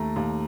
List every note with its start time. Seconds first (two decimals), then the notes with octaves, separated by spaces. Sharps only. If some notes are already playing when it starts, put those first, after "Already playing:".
Already playing: D#2 A3 A#5
0.16 D#2